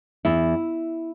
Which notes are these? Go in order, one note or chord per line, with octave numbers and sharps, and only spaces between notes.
E2 E4